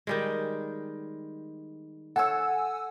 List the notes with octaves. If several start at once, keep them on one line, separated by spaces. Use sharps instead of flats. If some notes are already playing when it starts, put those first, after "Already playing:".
D#3 G3 G#3
A4 C#5 F#5 G#5 E6